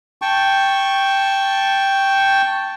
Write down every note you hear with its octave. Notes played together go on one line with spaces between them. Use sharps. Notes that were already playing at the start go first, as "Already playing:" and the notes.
G5 A5 C#6